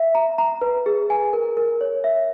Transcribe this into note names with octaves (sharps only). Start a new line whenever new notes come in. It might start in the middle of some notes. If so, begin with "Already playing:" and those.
Already playing: E5
A#5
A#5
B4
G#4
G#5
A#4
A#4
C#5
E5